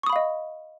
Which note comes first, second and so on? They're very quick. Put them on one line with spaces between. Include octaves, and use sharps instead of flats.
C#6 D#6 B5 F5 D#5